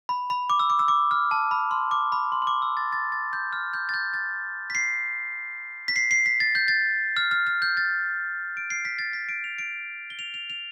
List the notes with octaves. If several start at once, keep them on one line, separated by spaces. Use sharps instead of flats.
B5
B5
D6
E6
D6
E6
D6
F6
A5
B5
C6
D6
B5
C6
C6
D6
E6
A6
A6
A6
G6
F6
G6
A6
G6
A6
B6
C7
B6
C7
C7
B6
A6
G6
A6
F6
F6
F6
G6
A6
D7
C7
B6
A6
B6
D7
F7
D7
G7
F7
F7
F7